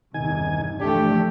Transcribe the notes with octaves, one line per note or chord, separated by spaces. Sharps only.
E2 G2 C3 D#3 G#5
E3 F3 A3 D4 G4